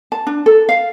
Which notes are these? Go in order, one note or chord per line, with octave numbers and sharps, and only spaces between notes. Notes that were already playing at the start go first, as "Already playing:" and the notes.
A5
D4
A4
F5